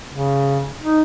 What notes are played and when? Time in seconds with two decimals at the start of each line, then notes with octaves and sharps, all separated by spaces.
0.10 C#3
0.82 D#4